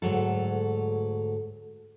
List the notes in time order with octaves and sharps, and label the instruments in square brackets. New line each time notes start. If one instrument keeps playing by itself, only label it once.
[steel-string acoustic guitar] D2 G#2 F#3 A4